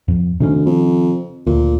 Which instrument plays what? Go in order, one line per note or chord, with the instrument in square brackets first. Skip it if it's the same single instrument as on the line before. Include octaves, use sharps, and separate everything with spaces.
[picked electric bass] F2
[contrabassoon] D2 [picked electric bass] C3 D#3 C#4
[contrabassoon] F2
[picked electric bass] D2 [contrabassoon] A#2